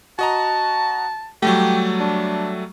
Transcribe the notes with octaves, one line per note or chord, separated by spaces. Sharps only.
F#4 D#5 A5 A#5
F#3 G3 A3 G4
D4